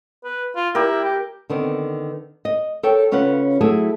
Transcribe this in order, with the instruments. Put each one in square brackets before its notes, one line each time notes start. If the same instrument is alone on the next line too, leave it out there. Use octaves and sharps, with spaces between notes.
[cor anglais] B4
F4
[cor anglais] E4 [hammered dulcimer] G4 A#4
[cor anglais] G4
[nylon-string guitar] D3 D#3 B3 C4
D#5
A4 A#4 C#5 G5
C#3 C#4 F4 B4 F#5
F#3 A3 E4 G#4 A4